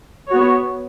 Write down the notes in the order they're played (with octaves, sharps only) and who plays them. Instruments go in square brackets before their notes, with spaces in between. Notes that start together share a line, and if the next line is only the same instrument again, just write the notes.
[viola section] B3 F#4 C#5